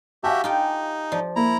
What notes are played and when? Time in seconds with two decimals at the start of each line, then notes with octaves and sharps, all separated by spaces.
0.24 F#4 G4 E5 F5 G#5 A5
0.44 D#4 F4 G4 G5
1.12 F3 D5
1.36 A#3 E4 A#5